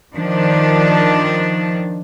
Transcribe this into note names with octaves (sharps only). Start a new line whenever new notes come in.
D#3 F3 D4